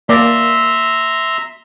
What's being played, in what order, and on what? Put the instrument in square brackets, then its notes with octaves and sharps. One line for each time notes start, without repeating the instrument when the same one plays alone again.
[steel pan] A#3 D5 [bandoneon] E5 A#5 C6